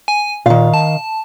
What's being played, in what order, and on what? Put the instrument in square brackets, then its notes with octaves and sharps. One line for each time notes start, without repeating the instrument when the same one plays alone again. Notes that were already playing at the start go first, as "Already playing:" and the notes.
[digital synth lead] G#5
[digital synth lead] A#2 [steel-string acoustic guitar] D#3 F5
[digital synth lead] A5